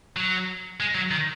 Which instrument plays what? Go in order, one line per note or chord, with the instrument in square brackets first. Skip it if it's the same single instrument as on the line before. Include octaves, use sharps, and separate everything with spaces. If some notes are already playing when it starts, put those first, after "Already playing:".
[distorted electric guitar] F#3
G#3
F#3
D#3